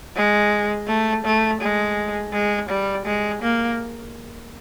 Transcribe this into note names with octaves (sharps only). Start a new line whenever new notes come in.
G#3
A3
A3
G#3
G#3
G3
G#3
A#3